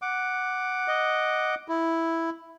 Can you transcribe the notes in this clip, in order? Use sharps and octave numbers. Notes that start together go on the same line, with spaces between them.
F#5 D6
D#5
E4